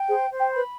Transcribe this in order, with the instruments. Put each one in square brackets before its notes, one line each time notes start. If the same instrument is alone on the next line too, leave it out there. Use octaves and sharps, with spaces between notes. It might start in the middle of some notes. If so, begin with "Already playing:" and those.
Already playing: [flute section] G5
[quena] G#4 [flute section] C5
[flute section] C5
[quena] G5
[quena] B4 [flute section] B5